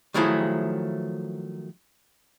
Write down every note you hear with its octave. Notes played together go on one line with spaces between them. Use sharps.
D#3 F3 F#3 A3 E4 G#4